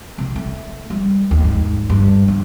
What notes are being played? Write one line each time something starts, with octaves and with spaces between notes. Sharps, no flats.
C2
A3
G3
D#2
G#2
G2
G1